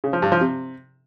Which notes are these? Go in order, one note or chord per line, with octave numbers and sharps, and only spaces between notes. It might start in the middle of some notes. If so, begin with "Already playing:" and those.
C#3
F3
G2
F3
C3